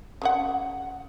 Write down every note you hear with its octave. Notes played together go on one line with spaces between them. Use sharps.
C#3 D4 F#5